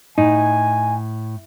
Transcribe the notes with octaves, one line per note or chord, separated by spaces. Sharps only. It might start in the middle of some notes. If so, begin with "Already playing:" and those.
A2 D#4 G#5